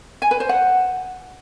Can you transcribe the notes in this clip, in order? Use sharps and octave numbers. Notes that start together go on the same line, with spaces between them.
G#5
B4
C5
F#5